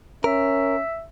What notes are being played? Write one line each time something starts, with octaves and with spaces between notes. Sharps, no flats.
C#4 A#4 E5